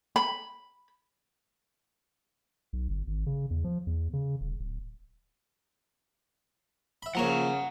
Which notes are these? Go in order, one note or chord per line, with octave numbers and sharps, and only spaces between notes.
B5
B1
G1
G#1
C#3
E2
F3
E2
C#3
D#1
D1
E5 B5
C#3 F3 A#3 C#5 F#5 A#5